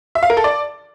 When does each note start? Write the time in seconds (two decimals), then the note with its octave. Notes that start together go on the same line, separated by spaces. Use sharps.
0.15 E5
0.23 F5
0.30 A#4
0.37 A4
0.44 D5